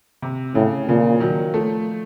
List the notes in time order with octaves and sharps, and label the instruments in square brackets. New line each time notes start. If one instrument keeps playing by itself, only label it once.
[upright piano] C3
[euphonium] A2 [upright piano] C#3
[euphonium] A#2 [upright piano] C#3 F3
[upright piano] D#3 F#3
F3 A3